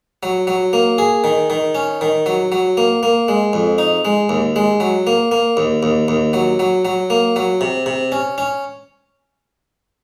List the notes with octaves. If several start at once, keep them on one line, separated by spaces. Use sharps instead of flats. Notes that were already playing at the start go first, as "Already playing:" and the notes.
F#3
F#3
A#3
G#4
D#3
D#3
C#4
D#3
F#3
F#3
A#3
A#3
G#3
F2
D#4
G#3
D#2
G#3
F#3
A#3
A#3
D#2
D#2
D#2
F#3
F#3
F#3
A#3
F#3
C3
C3
C#4
C#4